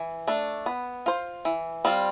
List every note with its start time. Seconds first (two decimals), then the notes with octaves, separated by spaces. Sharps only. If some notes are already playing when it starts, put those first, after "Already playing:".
Already playing: E3
0.27 A3 D4
0.66 B3
1.06 F4 C5
1.45 E3
1.85 G3 C4 F4